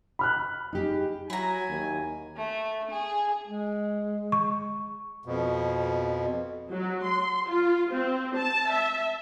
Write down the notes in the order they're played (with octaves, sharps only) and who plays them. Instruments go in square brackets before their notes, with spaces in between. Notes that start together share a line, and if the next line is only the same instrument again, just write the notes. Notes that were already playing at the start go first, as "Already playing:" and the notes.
[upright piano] B5 F6 F#6
[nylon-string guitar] D#4 G4 G#4
[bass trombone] F#3 [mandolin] E4 A#5 [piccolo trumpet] G#5
[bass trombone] D#2
[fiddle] A3
G#4
[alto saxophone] G#3
[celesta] C#6
[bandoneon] F2 B2
[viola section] F#3
C6
F4
C4
A5
E5